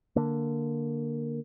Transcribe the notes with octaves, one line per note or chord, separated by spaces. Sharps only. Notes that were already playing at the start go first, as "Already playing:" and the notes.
D3 A#3